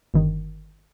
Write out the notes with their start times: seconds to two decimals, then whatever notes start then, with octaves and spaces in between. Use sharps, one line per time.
0.14 G1 D#3